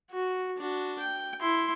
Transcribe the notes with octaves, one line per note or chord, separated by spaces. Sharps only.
F#4
D4 F#4
G5
E4 C6